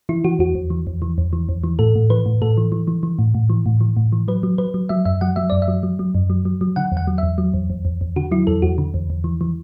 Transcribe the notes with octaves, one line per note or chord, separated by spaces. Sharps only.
E3 E4
E3 F#4
E2 F#4
E2
E3
E2
E3
E2
E3
E2
E3
A2 A4
A2
E3 B4
A2
A2 A4
E3
E3
E3
E3
A2
A2
E3
A2
E3
A2
E3
F#3 B4
F#3
F#3 B4
F#3
F#3 E5
F#2 E5
F#3 F#5
F#3 E5
F#2 D5
E5
F#3
F#3
F#3
F#2
F#3
F#3
F#3
D3 F#5
E2
F#5
F#3
E2 E5
F#3
E2
E2
E2
E2
D3 F#4
F#3 E4
E2 A4
E2 F#4
D3
E2
E2
E3
E3